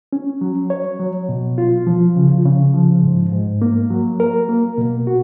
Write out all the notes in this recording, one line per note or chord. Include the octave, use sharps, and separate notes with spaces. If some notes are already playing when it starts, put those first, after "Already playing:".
C#4
F#3
C#5
F#3
B2
F4
F3
C#3
C#3
F3
G#2
G#2
A#3
F#3
A#4
A#3
B2
F#4